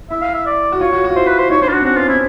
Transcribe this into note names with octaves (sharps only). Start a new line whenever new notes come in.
E4 E5
F5
E5
D5
F#4
F4 C#5
F#4
F#4
F4
E4 C5
B4
C5
D#4 C#5
D4 C5
F4
D4 F#4
C4
C#4 F#4
B3 F4
C4 E4